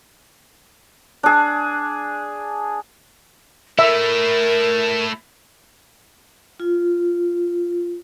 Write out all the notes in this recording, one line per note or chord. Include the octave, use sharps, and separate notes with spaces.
D4 G#4
A3 E4 A#4 E5
F4